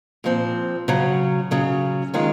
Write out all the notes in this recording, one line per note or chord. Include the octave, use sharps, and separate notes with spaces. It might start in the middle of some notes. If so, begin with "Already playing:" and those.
A#2 F3 C4
C#3 F#3 C#4
C#3 F#3 C#4
D#3 G#3 C#4 F4